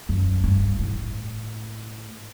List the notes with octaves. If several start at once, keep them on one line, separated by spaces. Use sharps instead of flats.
F#2
G2
A2